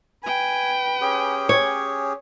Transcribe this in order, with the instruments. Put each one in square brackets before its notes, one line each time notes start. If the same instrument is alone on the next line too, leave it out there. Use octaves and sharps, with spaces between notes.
[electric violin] B4 G5 [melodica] G#5
[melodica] C#4 G4 G#4
[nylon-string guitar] C#5